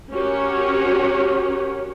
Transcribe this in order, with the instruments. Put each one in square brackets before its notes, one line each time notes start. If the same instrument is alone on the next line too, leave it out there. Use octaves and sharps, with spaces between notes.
[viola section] C#4 F#4 G4 A#4 C#5